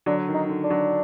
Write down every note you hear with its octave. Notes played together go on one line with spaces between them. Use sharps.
D3 F#3 D4
D#3
D#4
D3
D4
D3 F#3